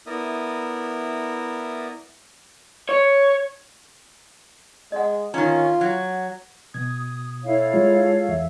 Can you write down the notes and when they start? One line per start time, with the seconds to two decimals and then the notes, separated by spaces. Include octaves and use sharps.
0.06 B3 E4 A#4 D5 E5 D#6
2.89 C#5
4.92 G#3 D#5 F#5
5.34 D#3 C#4 F4 A#5
5.81 F#3
6.74 B2 D#6 G#6
7.45 E4 A4 C#5 F5
7.73 G#3 F4 G#4
8.29 E2 E5